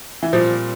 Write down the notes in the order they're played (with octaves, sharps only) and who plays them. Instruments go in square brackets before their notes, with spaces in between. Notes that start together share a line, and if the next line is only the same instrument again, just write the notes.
[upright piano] E3
[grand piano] A#2 G3 C4 [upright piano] F3